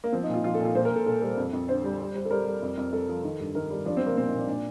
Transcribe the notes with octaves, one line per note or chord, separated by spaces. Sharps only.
A#3
F3 C4
D#4
A#2
F4
F3 F4
A4
A#2
F4
A#2 C5
A#4
A#2
A4
A#2 A4
G3 A4
F2
F2
D3 C5
G3
G3
G3
A4
G3 A#4
G3
F2
F2
F2 A4
F3
D#3
G2
D#3 A#4
G3
F3 D4
C4
F3
A#3
A#2 C4
D#4
A#2 D4
A#2 D4